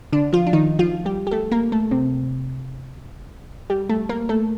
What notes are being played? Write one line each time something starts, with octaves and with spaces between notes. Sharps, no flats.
D3 D4
F3 F4
D4
D#3 D#4
F3 F4
G3 G4
G4
A3 A4
A#3 A#4
A3 A4
C3 C4
G3 G4
A3 A4
A#3 A#4
A3 A4